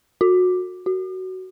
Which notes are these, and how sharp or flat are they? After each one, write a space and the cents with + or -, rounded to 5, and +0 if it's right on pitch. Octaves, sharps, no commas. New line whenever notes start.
F#4 -25
F#4 +15